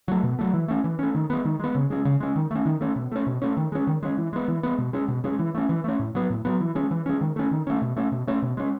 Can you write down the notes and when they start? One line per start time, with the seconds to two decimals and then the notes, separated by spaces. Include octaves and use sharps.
0.08 F#3 A3
0.23 B2
0.39 F#3 A3
0.54 E3
0.68 A3 C#4
0.84 E3
0.99 A3 C#4
1.15 D#3
1.30 G#3 B3
1.45 D#3
1.59 G#3 B3
1.75 C#3
1.90 G#3 C#4
2.05 C#3
2.20 G#3 C#4
2.36 D#3
2.51 A3 C#4
2.65 D#3
2.81 A3 C#4
2.96 B2
3.12 A3 C#4
3.27 B2
3.42 A3 C#4
3.57 D#3
3.72 G#3 C#4
3.87 D#3
4.03 G#3 C#4
4.17 E3
4.33 G#3 B3
4.48 E3
4.63 G#3 B3
4.78 B2
4.93 G#3 C#4
5.08 B2
5.24 G#3 C#4
5.39 E3
5.55 A3 C#4
5.69 E3
5.84 A3 C#4
5.99 A2
6.15 F#3 B3
6.30 A2
6.45 F#3 B3
6.60 E3
6.75 G#3 C#4
6.91 E3
7.06 G#3 C#4
7.21 D#3
7.36 A3 C#4
7.51 D#3
7.67 A3 C#4
7.82 B2
7.96 A3 C#4
8.12 B2
8.27 A3 C#4
8.42 B2
8.57 G#3 C#4